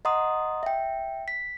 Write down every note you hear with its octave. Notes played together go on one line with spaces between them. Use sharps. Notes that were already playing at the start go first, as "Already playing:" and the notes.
D#5 F#5 A#5 C6 D#6
E5 G5
B6